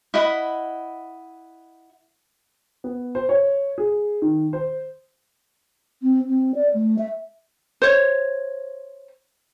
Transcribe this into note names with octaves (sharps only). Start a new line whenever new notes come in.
E4 D#5 F#5 B5
B3
C5
C#5
G#4
D#3
C5
C4
C4
D5
A3
E5
C5 C#5